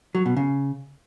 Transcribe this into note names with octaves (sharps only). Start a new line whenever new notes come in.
F#3
B2
C#3